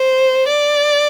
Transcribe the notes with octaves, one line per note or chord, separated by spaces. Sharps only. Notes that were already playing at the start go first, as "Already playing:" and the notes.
Already playing: C5
D5